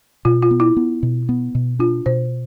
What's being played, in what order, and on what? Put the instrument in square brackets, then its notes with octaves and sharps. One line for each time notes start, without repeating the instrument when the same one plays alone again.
[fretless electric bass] B2 [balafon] F4
[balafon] F4
[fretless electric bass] B3
[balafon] E4
[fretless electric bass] B3
B2
B3
B2
[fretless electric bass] D4 [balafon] F4
[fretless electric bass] B2 [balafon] C5